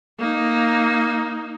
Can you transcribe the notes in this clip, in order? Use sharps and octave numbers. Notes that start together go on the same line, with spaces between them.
A#3 D#4